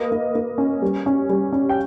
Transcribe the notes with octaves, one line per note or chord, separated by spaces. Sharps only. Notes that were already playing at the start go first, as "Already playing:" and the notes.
Already playing: A#3 B4 D#5
A#3
A#3
C#4
G3
C#4
G3
C#4
G5